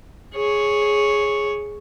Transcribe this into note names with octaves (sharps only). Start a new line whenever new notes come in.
G#4 C#5